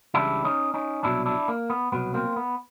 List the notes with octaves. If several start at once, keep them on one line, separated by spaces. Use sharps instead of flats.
C#2 C#3 E3 G3 D4 E4
C#4 D#4
C#4 D#4
C2 B2 F#3 D4 E4
D4 E4
A#3
B3
C2 B2 F#3 B3
A#3 C4
B3